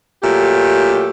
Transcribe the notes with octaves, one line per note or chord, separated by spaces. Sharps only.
A#2 F#3 A3 G4